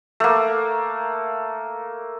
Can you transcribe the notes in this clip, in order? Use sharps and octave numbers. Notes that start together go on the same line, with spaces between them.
A3 A#3